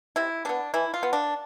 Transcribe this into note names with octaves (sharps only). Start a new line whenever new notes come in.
C3 E4
G3 B3 D4
E3 E4
F4
B3
D4